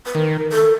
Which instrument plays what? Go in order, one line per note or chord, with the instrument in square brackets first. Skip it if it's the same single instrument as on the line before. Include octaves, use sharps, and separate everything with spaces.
[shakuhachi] B4
[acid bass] D#3 [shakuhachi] A#4
[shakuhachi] A4